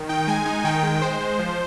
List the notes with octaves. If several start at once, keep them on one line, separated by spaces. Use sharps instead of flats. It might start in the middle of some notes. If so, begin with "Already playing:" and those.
Already playing: D#3
D#4 G5
G#3 G#5
D#4
D#3 G5
G#3
G#3 C5
G#3
F3